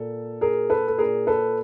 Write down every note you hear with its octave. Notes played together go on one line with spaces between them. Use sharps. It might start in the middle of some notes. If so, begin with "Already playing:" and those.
Already playing: A#2 A4
G#4 A#4
A4 B4
A4
A#2 G#4 A#4
A4 B4